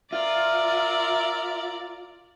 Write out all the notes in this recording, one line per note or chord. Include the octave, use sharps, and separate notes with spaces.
F4 A#4 D5 E5